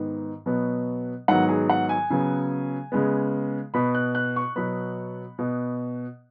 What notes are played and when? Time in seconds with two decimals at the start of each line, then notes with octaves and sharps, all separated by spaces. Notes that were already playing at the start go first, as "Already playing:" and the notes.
Already playing: G#2 D#3 B3
0.46 B2 F#3 B3
1.28 G#2 D#3 F#3 B3 F#5
1.49 G#4
1.69 F#5
1.89 G#5
2.10 C#3 F#3 B3
2.92 C#3 G#3 B3
3.74 B2 B3 B5
3.95 F#6
4.15 F#6
4.36 C#6
4.56 B2 F#3 B3 B5
5.38 B2 B3